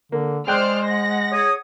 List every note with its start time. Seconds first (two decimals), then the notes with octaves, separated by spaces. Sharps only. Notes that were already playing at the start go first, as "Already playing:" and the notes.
0.12 D3 A#3
0.47 G#3 G#4 C5 D5 G5 F6 F#6
0.85 F#5 A#6
1.32 G#4 C#5 D#6